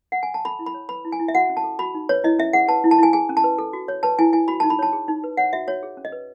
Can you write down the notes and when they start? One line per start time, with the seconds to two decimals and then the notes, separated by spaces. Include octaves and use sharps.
0.12 F#5
0.23 G#5
0.34 A5
0.45 A4 B5
0.59 E4
0.66 B5
0.74 C#5
0.89 B4 B5
1.05 E4
1.12 G#5
1.20 E4
1.28 E5
1.35 F#4 F#5
1.49 C#4
1.57 A5
1.64 A4
1.79 F#4 B5
1.95 D#4
2.09 B4 C#5
2.24 E4 D#5
2.39 C#4 E5
2.53 G#4 F#5
2.68 B4 A5
2.84 E4
2.91 A5
2.99 E4 G#5
3.13 G#4 G#5
3.29 C#4
3.37 A5
3.44 B4
3.58 A4
3.73 F#4
3.88 C#5
4.03 B4 A5
4.19 E4 G#5
4.33 E4 G#5
4.48 F#4 B5
4.60 A5
4.63 D#4
4.70 B5
4.79 C#5 A5
4.93 G#4
5.08 D#4
5.24 B4
5.37 C#5 F#5
5.53 F#4 E5
5.67 F#4 C#5
5.83 G#4
5.97 C#4
6.05 D#5
6.12 B4